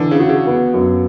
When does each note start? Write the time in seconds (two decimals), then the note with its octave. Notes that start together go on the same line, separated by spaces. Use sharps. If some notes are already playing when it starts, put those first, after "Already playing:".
Already playing: D3 E3
0.11 C#3
0.20 F#4
0.29 C#3
0.47 B3
0.74 F#2